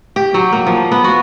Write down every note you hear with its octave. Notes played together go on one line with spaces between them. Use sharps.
G4
F#3
A#3
F3
B3
F#4